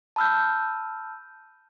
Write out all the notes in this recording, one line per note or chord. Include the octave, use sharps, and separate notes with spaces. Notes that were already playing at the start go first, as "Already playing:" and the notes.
A5 B5 E6 F6 G6